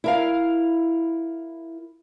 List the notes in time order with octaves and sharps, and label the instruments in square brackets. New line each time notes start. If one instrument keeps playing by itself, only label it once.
[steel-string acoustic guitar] E4 A#4 F5